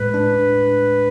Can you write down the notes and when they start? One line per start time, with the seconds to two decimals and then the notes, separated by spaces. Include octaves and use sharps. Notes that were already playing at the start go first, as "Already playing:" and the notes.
Already playing: A2 G#3 B4
0.14 D4